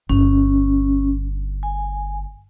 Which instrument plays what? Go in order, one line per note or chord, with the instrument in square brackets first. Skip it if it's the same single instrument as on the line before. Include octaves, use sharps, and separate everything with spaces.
[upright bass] G1 [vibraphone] C#4
[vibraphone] G#5